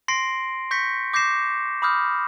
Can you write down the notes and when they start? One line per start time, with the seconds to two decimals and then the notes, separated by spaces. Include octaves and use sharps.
0.08 C6 A#6 C7 D7
0.71 C#6 G6 A#6 B6 C#7
1.14 D6 G6 A#6 C7 E7
1.82 B5 D6 D#6 F6 G6